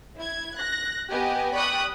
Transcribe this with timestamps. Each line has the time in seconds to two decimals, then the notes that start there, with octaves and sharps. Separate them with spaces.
0.17 E4 G#6
0.56 F#6 A#6
1.10 B3 G4 D#5 G#5
1.55 D5 G5 B5 C#6 D#6 F#6